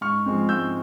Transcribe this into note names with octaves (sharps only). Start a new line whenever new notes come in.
G#2 C#6 F6
F3 G#3 C4
G#2 E6 G6